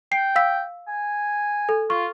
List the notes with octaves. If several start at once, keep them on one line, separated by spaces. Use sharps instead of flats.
G5 C7
F5 E6 B6
G#5
A4
F4 C#6